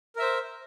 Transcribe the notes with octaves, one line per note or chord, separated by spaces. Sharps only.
A#4 C5 E5